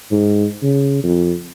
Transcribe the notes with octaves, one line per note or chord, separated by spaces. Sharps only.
G#2
C#3
F2